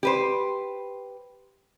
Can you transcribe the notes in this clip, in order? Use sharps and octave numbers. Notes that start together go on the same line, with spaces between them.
G4 B4 C5